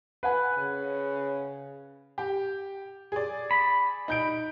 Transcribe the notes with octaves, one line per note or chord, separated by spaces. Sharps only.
B4 F#5 G#5
C#3
G4
G#4 D5
B5
D#4 G6 D7